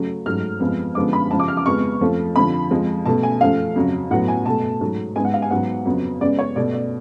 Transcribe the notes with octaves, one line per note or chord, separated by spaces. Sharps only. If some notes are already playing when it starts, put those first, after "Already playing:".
Already playing: C#3 F#3 A3
G#2 F#3 A3 F6
F2 F3 G#3 B3
F#2 D3 F3 G#3 B3 D6
B5
F#2 C#3 F3 A5
D6
F6
D6
F2 C#3 G#3 B3 C#6
F2 F3 A3
F2 D3 F3 B5
F2 F3 G#3
B2 A3 A5
G#5
F#2 F3 A3 F5
F2 C#3 F#3
A2 F#3 B3 F#5
G#5
B2 A3 A5
G#2 F#3 A3
G#2 G#3 B3 G#5
F#5
F5
G#5
G#2 F#3 B3 F#5
F2 C#3 F#3 B3
F#2 C#3 G#3 B3 D5
C#5
B2 A3 D5
D5